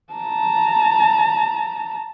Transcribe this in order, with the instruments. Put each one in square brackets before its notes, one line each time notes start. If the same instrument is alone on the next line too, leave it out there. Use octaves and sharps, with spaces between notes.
[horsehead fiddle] A5 A#5